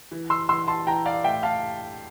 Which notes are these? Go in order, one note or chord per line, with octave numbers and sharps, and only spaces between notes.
E3
C6 E6
E3 C6 E6
A5 C6
E3 G5 A#5
D5 F5
A2 E5 G5
F5 A5